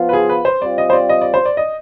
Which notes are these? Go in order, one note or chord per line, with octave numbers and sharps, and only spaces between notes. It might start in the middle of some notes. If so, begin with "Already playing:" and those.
Already playing: F3 B3 F4
B4
G#4
B4
C5
G3 C4 F4 D5
D#5
C5
D5
D#5
D5
C5
D5
D#5